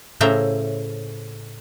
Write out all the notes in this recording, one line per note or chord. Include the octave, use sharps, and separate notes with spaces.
A2 C#3 C#4 C5 E5 A#5